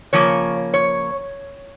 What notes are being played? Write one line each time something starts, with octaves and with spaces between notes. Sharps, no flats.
C#3 F3 A#3 C#5
C#5